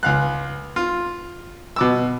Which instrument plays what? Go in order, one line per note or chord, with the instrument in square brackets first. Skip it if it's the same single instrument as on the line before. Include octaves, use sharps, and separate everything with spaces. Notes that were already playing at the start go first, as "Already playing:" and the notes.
[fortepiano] C#2 F5 F#6
F4
B2 D6 E6